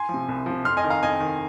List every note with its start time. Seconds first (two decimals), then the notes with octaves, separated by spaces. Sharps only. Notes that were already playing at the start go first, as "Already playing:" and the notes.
Already playing: G#5 C6
0.09 F3
0.14 C3
0.29 C2
0.46 C3 F3
0.65 F2 C6 F6
0.77 D#5 G#5
0.84 D#3
0.90 F5 A#5
1.03 F2 D#5 G#5
1.20 D#3